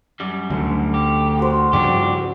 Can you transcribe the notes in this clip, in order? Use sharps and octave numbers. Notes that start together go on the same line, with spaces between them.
F#2 G3
D2 D3
G4
F#4 C5
G2 C#3 F3 D4 G4